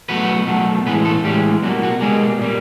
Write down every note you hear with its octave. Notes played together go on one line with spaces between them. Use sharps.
B2 F#3 A3 B3 B4
B2 F#3 A3
A2 E3 G#3 B3 B4
A3 A4
A2 E3 G3 G#3 G4
B2 F#3 G3 A#3 F#4
F#3 F#4
B2 G3 G#3 A#3 G#4
A#2 G3 A#3